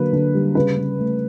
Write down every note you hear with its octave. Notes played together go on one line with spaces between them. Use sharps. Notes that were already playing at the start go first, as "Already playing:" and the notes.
Already playing: D3 F#3 A#3 B4
D3
G3
C#3 B4
C#3
A3